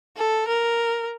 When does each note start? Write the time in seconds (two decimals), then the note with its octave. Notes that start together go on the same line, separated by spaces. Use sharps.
0.17 A4
0.48 A#4